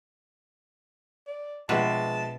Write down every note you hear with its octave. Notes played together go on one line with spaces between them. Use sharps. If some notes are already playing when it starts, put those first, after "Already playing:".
D5
A#1 B2 G#3 B4 A5